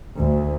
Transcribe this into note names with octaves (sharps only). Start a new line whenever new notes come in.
D2